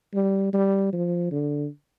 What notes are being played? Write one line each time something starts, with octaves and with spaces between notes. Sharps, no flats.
G3
G3
F3
D3